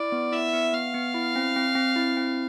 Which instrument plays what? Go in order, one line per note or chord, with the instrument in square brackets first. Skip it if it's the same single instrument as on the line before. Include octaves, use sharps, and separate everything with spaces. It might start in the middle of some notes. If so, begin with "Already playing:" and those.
Already playing: [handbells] E4 [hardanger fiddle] D5
[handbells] B3
[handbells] E4 [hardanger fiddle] E5
[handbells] B3
[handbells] B3 [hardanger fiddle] F5
[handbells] B3
E4
C4
C4
C4
E4
C4